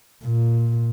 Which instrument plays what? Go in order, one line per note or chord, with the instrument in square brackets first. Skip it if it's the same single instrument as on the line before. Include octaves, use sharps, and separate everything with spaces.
[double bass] A#2